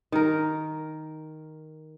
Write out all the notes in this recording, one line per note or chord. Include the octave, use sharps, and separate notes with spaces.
D#3 A#4